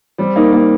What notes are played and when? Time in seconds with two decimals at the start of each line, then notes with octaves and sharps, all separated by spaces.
0.18 G3 C4
0.36 A#3 D#4
0.53 A#3 D#4